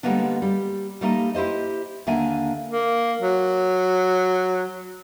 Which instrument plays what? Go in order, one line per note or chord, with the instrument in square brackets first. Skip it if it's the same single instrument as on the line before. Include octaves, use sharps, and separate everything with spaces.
[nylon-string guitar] D3 G3 G#3 A#3 B3 D4
G3
G3 A3 A#3 D#4
E4 G4 C5 D#5
D#2 D3 A#3 E5 G#5
[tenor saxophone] A#3
F#3